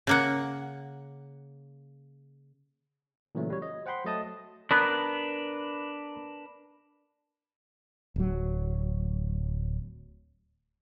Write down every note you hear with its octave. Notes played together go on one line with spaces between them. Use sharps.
C#3 A#3 F#5
A#2 C#3 E3 F#3 A3
G3 C#5
D#5
C5 F#5 G5 B5 C6
F#3 A3 D#5 A5 D#6
B3 D4 A#4 B4
D1 F#3